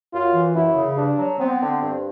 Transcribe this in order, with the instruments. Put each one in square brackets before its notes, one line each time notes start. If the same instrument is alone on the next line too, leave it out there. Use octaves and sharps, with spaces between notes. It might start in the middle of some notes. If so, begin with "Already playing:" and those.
[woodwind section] F#2 [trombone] F4
[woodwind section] E3
[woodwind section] F#2 [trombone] E4
[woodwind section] C#3
[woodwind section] G2 [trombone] D4
[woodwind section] F#3
[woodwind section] B3 [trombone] C4
[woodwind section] D3
G2